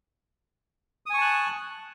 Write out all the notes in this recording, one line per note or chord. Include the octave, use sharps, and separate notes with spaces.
G#5 A5 C#6 D#6 F#6